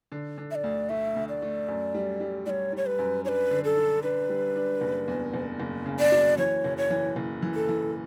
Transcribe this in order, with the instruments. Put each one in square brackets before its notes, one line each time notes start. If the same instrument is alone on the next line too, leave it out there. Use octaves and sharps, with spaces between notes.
[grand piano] D3
D3
[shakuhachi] E5
D5
[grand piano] D2
[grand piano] A3 [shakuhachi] E5
[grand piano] D2
[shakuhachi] D5
[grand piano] A3
F#2
G3
G3
[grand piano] G3 [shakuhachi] C#5 D5
[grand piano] G3 [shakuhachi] C#5
[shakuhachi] B4
[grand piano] F#2
[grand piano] D4 [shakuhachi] C#5
[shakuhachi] B4
[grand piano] D3
[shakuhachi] A4
[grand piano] D4
[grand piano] D4 [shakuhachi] B4
[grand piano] G3
D4
F#1
E2
F#1
F#1
C#3
[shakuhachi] D5
[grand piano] F#3
[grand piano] E3 [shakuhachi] C#5
[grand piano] F#1
[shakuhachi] C#5
[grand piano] E3
F#1
E3
[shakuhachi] A4
[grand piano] E3